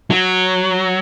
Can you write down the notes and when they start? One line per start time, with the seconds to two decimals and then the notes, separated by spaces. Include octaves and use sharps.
0.10 F#3